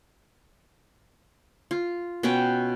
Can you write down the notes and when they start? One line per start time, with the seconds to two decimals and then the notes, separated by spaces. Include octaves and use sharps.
1.71 F4
2.23 B2 B3 C#4 G5